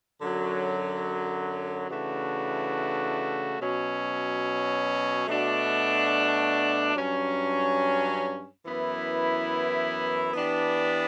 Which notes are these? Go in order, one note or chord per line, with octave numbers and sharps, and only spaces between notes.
F#2 D3 F#3
C#3 E3 A3 D4 F#4
B2 F#3 C#4
B2 A3 D4 F#4
G2 F#3 C#4
F#2 E3 B3 E4
E3 B3 D4 G4